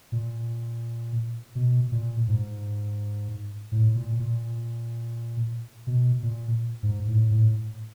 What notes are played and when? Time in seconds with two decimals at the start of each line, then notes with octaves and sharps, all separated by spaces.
0.12 A#2
1.55 B2
1.92 A#2
2.28 G#2
3.72 A2
3.95 A#2
4.19 A#2
5.87 B2
6.23 A#2
6.83 G#2
7.07 A2
7.31 A2